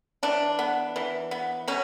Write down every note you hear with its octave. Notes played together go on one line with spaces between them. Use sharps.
E3 D4
B3
E3
B3
B2 C#4